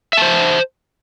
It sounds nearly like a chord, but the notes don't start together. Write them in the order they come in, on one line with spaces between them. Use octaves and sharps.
E5 A5 C5